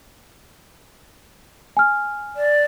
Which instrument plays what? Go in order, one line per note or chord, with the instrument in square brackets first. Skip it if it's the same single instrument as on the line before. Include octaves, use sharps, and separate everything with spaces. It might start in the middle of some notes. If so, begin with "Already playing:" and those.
[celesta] G#5 F6
[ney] D5